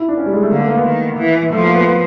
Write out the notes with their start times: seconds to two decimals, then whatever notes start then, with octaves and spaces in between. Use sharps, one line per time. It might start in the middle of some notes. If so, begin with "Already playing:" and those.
Already playing: E4
0.08 D4
0.17 C#4
0.26 G3
0.34 G#3
0.43 A3
0.51 D3 A#3
0.60 A3
0.68 A#3
0.77 B3
0.85 D#3
1.18 E3
1.52 F3 A3
1.64 A#3
1.75 B3
1.86 B3